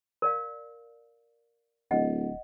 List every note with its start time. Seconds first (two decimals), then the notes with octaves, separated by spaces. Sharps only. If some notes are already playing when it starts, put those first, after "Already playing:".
0.22 A#4 D5 F5
1.91 D1 D#5 F#5